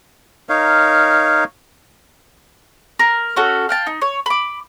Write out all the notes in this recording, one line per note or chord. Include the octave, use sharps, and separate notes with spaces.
D#4 A#4 C#5 F5
A#4
C#4 F#4 A4
F5 G5 A5
D#4
C#5
B5 D6